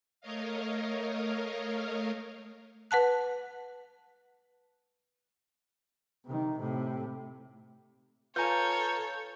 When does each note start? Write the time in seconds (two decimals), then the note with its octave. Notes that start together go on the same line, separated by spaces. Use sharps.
0.21 A3 A#4 C#5 D#5 F5
2.91 B4 F#5 A5 F#6
6.25 C3 D#3
6.59 A2 C3
8.36 F4 A4 B4 C#5 F5 G#5 A#5 G6